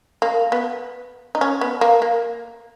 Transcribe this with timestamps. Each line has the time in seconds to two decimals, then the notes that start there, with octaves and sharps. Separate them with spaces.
0.22 A#3
0.52 B3
1.35 D#4
1.41 C#4
1.61 B3
1.81 A#3
2.02 A#3